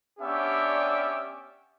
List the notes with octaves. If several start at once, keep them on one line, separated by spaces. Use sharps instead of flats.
B3 C#4 D4 G4 D5 E5